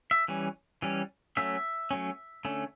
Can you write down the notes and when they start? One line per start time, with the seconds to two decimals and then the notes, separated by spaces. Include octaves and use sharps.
0.11 E5
0.28 E3 G3 C#4
0.82 E3 G3 C#4
1.37 F#3 A3 C#4 E5
1.91 F#3 A3 C#4
2.45 D3 A3 C#4